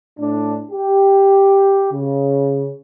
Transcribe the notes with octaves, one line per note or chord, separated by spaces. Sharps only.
A2 D4
G4
C#3